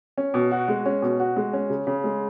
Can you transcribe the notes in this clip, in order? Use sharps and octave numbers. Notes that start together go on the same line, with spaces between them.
C#4
B2
F#4
G#3
C#4
B2
F#4
G#3
C#4
C#3
C#3
G#3